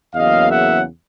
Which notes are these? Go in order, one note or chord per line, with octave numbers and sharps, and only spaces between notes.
E2 C#3 F#3 A#3 D#5 F5
E5 F#5